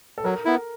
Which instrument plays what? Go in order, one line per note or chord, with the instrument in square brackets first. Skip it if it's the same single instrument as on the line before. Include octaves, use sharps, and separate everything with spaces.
[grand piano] A4
[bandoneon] F#3 [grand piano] A#4
[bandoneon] B3 E4